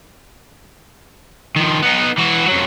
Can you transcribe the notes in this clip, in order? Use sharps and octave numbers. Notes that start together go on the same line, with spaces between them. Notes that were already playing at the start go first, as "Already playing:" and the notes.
D#3 F3
B3 D#4
E3 F#4
F2 F#3